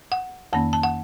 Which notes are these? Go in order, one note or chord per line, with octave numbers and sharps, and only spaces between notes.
F#5
F2 D#3 A#3 C#4 A5
A5
F#5